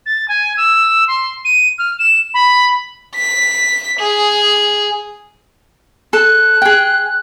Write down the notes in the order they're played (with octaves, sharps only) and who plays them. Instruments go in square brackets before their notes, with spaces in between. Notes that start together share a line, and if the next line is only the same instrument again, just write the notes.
[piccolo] A6
G#5
E6
C6
D#7
F6
E7
B5
[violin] B6
G#4
[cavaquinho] A4 [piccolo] F#6
[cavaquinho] G#4 G5